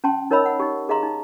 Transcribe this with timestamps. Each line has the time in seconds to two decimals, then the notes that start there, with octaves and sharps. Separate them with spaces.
0.04 C#4 G5 A5 C6
0.31 D#4 A#4 C#5 D#5 B5 E6
0.46 F#5
0.60 D#4 G4
0.89 G#4 D#5 F5 A#5 C6
1.03 D#4